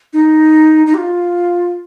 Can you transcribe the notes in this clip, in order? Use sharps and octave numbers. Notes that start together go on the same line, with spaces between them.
D#4
D#4
G4
F4